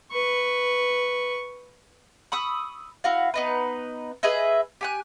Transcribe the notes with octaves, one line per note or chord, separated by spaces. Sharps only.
B4 C#6
B5 C#6 D#6 E6
E4 F#4 F5
B3 D#4 B4
G#4 B4 D#5 E5
G4 G#5 F#6